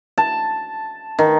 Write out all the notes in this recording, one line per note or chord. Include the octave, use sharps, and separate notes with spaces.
A5
D#3